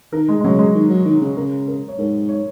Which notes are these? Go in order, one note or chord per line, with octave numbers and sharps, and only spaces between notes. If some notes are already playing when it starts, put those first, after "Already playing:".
D#3 A#4
G#3
G#3
C#3 F#3
G#3
D#3
F#3
D#3
C#3
C#3 A#4
A#4
C#5
G#2 A#4
C#5